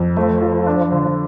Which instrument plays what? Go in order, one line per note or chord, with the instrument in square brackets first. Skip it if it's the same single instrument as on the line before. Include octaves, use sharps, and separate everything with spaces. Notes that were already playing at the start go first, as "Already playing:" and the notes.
Already playing: [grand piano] F2
[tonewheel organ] F3 [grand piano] A3
[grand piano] F4
D4
D3